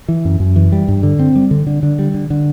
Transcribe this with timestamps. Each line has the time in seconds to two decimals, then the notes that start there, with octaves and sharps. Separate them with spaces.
0.08 E3
0.25 F#2
0.40 F#2
0.56 E3
0.72 G3
0.88 G2
1.03 D3
1.19 C4
1.36 G3
1.51 D3
1.67 D3
1.83 D3
1.99 G3
2.14 D3
2.30 D3